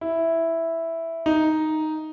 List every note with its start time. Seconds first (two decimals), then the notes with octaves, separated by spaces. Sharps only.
0.01 E4
1.26 D#4